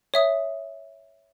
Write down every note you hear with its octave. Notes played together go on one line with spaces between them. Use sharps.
C#5 E5 D#6